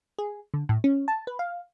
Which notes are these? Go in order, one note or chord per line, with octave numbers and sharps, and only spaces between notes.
G#4
D3
A2
C#4
A5
B4
F5